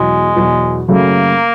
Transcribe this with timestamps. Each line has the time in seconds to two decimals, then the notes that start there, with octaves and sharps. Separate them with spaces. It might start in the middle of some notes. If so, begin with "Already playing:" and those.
Already playing: E2 B2 F#3 G#3
0.36 E2 B2 F#3
0.88 F#2 C#3 F#3 A3 A#3